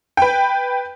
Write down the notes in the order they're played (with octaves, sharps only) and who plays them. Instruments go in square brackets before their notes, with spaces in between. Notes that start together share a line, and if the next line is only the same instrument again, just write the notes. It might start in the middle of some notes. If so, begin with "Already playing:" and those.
[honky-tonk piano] B4 G5